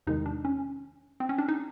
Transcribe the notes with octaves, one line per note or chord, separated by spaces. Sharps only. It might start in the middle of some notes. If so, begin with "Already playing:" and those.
E2 C3 D#3 G#3 D#4
D4
C#4
C4
C#4
D4
D#4